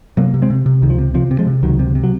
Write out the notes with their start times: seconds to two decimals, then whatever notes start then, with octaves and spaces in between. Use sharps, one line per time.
0.17 C3 F#3 A#3
0.34 C3
0.42 G#3 C4
0.50 C3
0.66 C3
0.82 C#2 D#3
0.90 F3
0.98 C3
1.14 C3 F3
1.31 C3
1.39 F3 G#3
1.47 C3
1.63 C#2 D#3 F#3
1.79 C3
1.95 C3
2.04 F#3